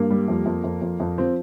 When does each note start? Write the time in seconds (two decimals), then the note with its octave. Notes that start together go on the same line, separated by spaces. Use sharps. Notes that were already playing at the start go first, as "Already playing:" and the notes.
Already playing: G2 A#3
0.11 G3
0.28 F2
0.46 F2
0.64 F2
0.82 F2
1.00 F2
1.18 F3 C4